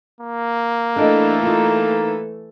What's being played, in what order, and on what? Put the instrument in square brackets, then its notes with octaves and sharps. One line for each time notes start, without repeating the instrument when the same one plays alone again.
[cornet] A#3
[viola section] E3 A3 A4 [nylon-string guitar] D4 D5 D#5
[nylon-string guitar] D#4 F4